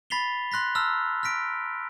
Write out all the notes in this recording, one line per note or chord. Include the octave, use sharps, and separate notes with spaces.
B5 A6 B6 C7 F7 G7
C6 F#6 A#6 B6
A5 A#5 E6 F6
F6 A#6 B6 D7